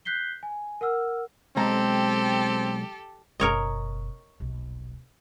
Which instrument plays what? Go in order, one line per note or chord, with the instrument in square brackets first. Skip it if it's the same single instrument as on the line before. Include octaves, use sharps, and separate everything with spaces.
[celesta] F#6 G6 B6 C7 G7
G#5
A#4 F#5 E6 F6
[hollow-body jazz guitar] B1 G#3 A#5 [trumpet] C4 [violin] G4 A4
[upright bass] F#1 B2 [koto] A#4 C#5 D#5
[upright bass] D#1 B1